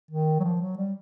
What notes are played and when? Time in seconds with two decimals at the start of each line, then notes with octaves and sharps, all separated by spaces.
0.11 D#3
0.40 F#3
0.44 F3
0.61 F#3
0.77 G3